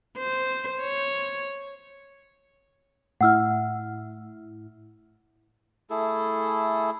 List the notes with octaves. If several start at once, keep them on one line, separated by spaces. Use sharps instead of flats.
C5
C#5
A2 E4 F#5 E6 F6
A3 E4 G#4 A4